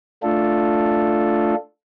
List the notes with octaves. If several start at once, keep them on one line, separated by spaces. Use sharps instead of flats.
A3 D4 F4 A4